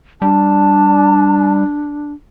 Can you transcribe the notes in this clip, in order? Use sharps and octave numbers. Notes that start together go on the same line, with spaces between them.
G3 D4 A5